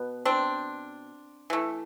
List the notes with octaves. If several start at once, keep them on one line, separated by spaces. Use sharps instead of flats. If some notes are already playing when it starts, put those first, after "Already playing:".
Already playing: B2 B3
C4 D4
E3 A3